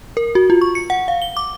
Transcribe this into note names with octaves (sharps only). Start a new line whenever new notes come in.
A#4
F#4
F4
C#6
C#7
F#5
F5
G7
D6